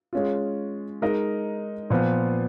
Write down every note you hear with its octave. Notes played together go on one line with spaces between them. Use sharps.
G#3 C#4 F4
G#3 D#4 A#4 D#5
A#2 F3 B3